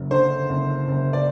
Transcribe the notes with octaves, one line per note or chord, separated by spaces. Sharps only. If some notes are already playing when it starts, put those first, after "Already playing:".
Already playing: F#1 F#3
D3 C5
F#1
F#1
D5